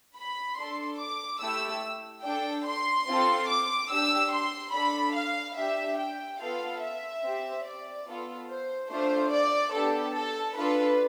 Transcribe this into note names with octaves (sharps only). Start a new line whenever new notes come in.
B5
D4 A4 C6
D6
A3 E4 G4 E6
D4 A4 G5
C6
C4 F4 A4
D6
D4 G4 E6
C6
D4 A4 B5
F5
D4 G4 E5
G5
B3 F4 A4 F5
E5
C4 G4
D5
B3 F4 A4
C5
A3 D4 F4 C5
D5
B3 D4 G4 A4
A4
D4 F4 A4 B4